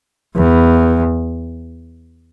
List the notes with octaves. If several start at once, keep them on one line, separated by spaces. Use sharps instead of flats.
E2